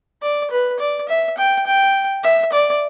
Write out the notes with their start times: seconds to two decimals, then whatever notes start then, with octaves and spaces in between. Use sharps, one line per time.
0.22 D5
0.51 B4
0.80 D5
1.09 E5
1.38 G5
1.66 G5
2.24 E5
2.52 D5